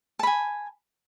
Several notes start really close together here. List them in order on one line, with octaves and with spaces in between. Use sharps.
A5 B5 G#5